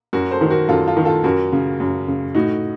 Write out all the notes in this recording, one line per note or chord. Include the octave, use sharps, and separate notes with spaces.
F#2 F#4 A#4
A4 C5
D#3
F#4 A#4
F#2 F4 A4
F4 A4
D#3
F4 A4
F#2 F#4 A#4
C#3
F#2
C#3
A2 D#4 F#4